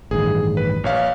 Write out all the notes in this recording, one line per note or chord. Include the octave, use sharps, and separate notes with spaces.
A1 G2 D#3 G#4
B4
A#1 C#5 F5